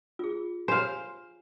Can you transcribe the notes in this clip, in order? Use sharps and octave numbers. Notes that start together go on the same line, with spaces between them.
F4 G#4
C5 F5 G#5